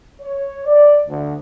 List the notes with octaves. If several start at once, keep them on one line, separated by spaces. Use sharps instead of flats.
C#5
D5
D2